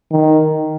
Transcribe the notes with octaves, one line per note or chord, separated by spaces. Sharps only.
D#3